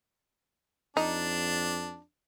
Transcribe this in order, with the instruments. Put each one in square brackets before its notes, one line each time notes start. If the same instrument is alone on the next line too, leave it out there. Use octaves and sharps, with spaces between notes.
[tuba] F2 [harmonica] D4 [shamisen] D#4